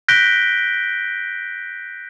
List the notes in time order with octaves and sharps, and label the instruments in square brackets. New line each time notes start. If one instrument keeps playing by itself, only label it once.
[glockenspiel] F#6 G6 A#6 B6 D7 G7